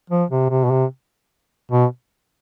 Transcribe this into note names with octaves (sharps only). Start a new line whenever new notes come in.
F3
C3
C3
B2
C3
B2